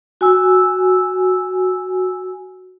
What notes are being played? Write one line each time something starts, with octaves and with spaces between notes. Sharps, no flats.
F#4 G#5 E6